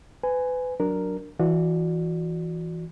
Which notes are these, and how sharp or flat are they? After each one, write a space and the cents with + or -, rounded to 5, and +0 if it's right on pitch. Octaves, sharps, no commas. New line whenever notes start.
B4 +30 G#5 +0
F#3 +0 D4 +0 A#4 -5
E3 +0 F#4 -20 D5 +20